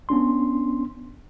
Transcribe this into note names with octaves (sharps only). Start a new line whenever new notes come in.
B3 C#4 D4 C6